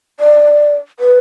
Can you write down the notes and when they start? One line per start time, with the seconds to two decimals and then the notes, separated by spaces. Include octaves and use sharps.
0.20 D5
1.00 B4